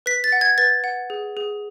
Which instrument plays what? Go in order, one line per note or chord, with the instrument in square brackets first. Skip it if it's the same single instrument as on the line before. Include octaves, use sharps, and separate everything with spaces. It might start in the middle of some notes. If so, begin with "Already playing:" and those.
[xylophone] B4 B6
A6
F#5
G#6
B4 A6
F#5
G#4
G#4